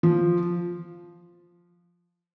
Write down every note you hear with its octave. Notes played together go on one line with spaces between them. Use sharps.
F3